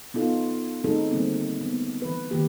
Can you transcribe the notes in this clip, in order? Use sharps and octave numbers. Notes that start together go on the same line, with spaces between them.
B3 D#4 F4 A4
A3 C4 C#4 D#4 G#4 A4
D3 G3 G#3 A#3 C4
B3
E3 B4
D3 D#3 A#3 G4